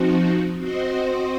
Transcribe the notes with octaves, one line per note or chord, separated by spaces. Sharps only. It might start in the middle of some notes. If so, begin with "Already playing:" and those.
Already playing: F3 C4 D#4 F#4
C4 F#4 C5 D#5